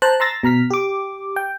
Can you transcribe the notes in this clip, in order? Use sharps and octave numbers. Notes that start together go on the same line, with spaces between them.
C5 A5 A#5 F#6
A#5 C6 E6 A6 A#6
B2 A#5 F6 B6
G4 D6
G5